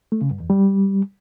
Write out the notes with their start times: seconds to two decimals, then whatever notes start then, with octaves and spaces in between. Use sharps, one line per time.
0.12 A3
0.21 C#3
0.31 G2
0.40 E2
0.50 G3